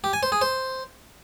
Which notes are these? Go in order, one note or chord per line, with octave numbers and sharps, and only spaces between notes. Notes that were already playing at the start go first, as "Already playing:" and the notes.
G4
G#5
C5
G#4
C5